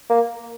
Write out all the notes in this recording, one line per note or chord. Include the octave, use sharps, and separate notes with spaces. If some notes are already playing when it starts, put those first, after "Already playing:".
A#3